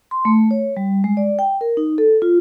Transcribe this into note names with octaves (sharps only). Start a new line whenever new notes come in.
C6
A3
C#5
G3
G#3
D5
G5
A#4
D#4
A4
F4